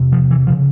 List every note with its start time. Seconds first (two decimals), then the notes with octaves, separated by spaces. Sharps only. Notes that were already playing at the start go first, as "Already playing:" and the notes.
Already playing: E2 C3
0.12 F3
0.31 E3
0.47 C#3 F3